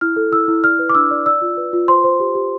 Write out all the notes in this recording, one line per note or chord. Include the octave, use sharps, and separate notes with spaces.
E4 F6
A4
E4 E6
E4
D5 F6
B4
D6
D4 E6
D5
D5 E6
F4
B4
F4
C5 C6
C5
G4
G4